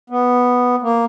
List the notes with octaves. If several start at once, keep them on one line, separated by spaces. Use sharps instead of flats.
B3
A#3